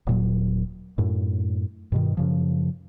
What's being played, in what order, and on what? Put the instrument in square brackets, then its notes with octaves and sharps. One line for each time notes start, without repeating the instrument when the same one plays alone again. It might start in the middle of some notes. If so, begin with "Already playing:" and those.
[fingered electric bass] D#1 A#2 F#3
F#2 A2
G2 B2 D#3
F#2 C#3 F3